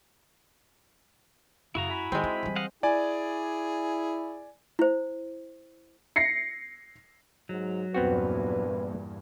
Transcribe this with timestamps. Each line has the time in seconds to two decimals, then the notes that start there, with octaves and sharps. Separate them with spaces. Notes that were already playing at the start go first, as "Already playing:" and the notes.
1.75 F#2 C#3 E4 F#4 A#5
1.89 E5 G#5 B5
2.12 D#3 G#3 C4
2.24 D#4
2.43 E3 G3
2.56 D#5 F5 F#5
2.83 E4 G#4 D5 G#5
4.79 E4 C5
6.16 A#6 C7 C#7
7.49 G#2 F#3
7.94 E2 G2 A#2 B3 C4 F#4 B4